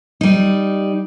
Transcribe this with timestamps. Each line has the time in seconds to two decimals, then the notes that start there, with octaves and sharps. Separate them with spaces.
0.21 G3 D#4